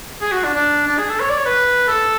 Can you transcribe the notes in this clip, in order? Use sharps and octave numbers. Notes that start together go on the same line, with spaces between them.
G#4
F#4
D4
D4
D4
G#4
A4
C#5
D5
C#5
B4
A4